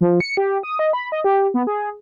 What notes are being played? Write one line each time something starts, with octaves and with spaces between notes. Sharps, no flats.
F3
C#7
G4
D#6
D#5
B5
D#5
G4
B3
G#4